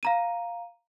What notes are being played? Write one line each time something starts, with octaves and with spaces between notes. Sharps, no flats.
F5 A#5 D#7